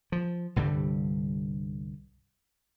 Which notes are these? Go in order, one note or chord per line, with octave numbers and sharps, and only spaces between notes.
F3
C2 G2 D3 G3